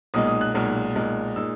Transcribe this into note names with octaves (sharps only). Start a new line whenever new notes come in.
B1 A#2 G#3 D#4 D#6
D#6
F#6
B1 A#2 G#3 D#4
B1 A#2 G#3 D#4
A#2 G#3 D#4 E6